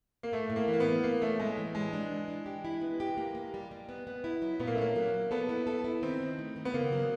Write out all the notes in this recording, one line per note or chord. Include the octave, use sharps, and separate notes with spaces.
A#3
A2 A3
A2
A#3
E3
A#3
B3
A3
A2 A#3
A3 C#4
A2 G#3
E3
G3 G#3
D4
E3
D4
G4
E4
B3
G4
A#3
A#3
G3
G3
B3
B3
E4
F#3
A#2 B3
A#3
A3
A#3 C#4
F#3
F#3
B3 A4
E4
A4
E4
D#3 C4
D#3
A3
D#3
B3
C#3 A#3
F#3